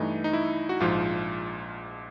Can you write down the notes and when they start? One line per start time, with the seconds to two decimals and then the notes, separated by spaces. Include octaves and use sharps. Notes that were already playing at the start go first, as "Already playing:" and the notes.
Already playing: G2 E3 A3 D#4
0.24 D#4
0.33 E4
0.69 F#4
0.80 A#1 G#2 F3 F4